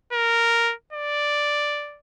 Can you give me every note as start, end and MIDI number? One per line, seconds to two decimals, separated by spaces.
0.13 0.73 70
0.93 1.99 74